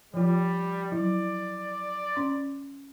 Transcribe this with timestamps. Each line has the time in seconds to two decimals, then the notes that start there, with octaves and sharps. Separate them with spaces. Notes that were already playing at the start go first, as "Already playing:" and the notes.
0.14 F3 G3 F4
0.92 F#3 E4 D5
2.16 C#4 C6